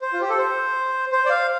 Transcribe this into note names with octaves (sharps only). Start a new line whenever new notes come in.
C5
F4
G4
A4
C5
C5
D5
F5